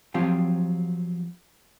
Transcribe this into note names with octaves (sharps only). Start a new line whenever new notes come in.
F3 F#3 C4 F4 G4